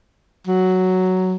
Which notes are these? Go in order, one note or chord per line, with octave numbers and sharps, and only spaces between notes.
F#3